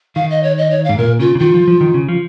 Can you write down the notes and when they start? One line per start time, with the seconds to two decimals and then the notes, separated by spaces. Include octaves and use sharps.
0.16 D#3 F5
0.31 D#5
0.43 C#5
0.58 D#5
0.71 C#5
0.84 F5
0.89 G#2
0.98 A#2 A#4
1.19 C#3 F4
1.35 C#3
1.39 D#3 F4
1.54 F3
1.68 F3
1.81 D#3
1.94 C#3
2.08 F3